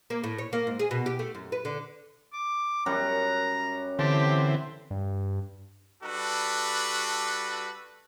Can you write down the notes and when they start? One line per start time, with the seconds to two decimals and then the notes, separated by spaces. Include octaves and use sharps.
0.10 A#3
0.24 A2
0.39 C#5
0.53 A#3
0.67 G#2
0.79 G#4
0.91 B2
1.06 G4
1.19 A3
1.35 F#2
1.52 B4
1.65 D3
2.33 D6
2.86 F#2 G3 F#5 A#5
3.99 D3 E3 C4 G4 A5
4.90 G2
6.03 G3 D4 F#4 A4 B4